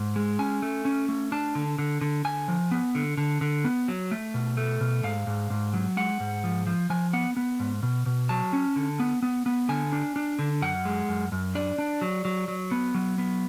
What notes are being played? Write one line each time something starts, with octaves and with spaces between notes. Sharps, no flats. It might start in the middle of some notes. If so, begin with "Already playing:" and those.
Already playing: G#2
G#3
C#4 G#5
A3
C#4
A3
D4 A5
D3
D3
D3
D3 G#5
F3
B3
D3
D3
D3
B3
F#3
A3
B2
A3
B2
G#2 F5
G#2
G#2
F#3
G#3 F#5
G#2
F3
F3
F3 G#5
B3 F#5
B3
G#2
B2
B2
F#3 A5
C#4
D3
B3
B3
B3
D3 G#5
D4
D4
D3
F#2 F#5
G#3
F#2
F#2
D4 D5
D4
F#3
F#3
F#3
B3
F#3
B3